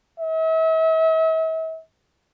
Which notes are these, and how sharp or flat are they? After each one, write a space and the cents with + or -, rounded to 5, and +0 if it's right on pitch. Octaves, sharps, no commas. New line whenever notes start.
E5 -40